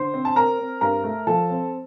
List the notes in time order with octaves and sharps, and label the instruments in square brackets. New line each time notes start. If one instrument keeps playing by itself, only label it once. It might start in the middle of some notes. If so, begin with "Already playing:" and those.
Already playing: [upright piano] D3 C5 C6
C4
A5
C4 A#4 A#5
C4
G2 A#4 A#5
A3
F3 A4 A5
C4